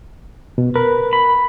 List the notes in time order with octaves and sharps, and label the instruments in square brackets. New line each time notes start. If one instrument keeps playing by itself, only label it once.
[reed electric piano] B2
[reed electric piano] A#4 [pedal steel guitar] B4
[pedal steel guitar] B5